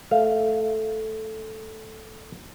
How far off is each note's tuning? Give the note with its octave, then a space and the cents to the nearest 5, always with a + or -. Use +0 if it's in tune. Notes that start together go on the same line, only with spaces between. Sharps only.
A3 -5 F5 +0